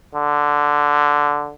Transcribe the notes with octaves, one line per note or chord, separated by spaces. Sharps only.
D3